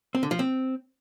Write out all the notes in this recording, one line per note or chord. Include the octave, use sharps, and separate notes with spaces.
C4
D3
F3
C4